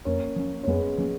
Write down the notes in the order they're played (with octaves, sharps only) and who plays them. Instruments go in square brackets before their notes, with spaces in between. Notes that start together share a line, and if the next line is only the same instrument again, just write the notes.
[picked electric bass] F2 [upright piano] A#3 C#4
[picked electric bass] F3 A#3 C#4
[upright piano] C#4
[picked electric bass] F2 [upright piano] G#3 B3
[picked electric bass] F3 A#3 C#4